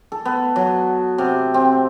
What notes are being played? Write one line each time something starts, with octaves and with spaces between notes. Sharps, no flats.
A4
B3
F#3
C3
C4